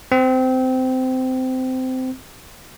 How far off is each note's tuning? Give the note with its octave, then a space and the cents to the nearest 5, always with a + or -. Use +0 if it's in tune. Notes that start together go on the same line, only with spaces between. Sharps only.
C4 -20